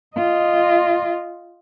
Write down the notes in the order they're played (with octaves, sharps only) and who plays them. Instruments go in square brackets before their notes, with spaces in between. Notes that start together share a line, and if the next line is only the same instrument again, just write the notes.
[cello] F4 D#5